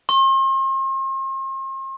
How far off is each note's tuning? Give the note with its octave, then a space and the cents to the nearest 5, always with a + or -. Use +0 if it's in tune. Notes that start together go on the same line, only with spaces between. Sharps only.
C6 +45